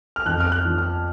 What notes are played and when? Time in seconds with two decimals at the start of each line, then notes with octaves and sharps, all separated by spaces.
0.16 F6
0.26 F2 F#6
0.40 F6
0.52 F#6
0.65 F3
0.78 F6